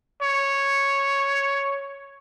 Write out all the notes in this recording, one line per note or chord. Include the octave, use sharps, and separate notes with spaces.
C#5